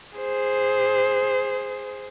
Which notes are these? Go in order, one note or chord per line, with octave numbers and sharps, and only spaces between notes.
G#4 C5